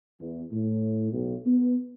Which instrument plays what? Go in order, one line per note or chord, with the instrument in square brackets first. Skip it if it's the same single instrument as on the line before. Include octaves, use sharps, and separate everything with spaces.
[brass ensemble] E2
A2
B1
B3